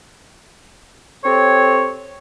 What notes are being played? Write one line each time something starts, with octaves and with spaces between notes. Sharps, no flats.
C4 G4 A4 C#5